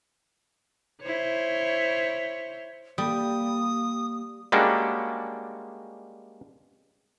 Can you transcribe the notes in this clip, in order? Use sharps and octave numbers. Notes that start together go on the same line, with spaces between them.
E4 C5 C#5
G3 A#3 D#6
G3 G#3 A#3 C#4 D4 F#4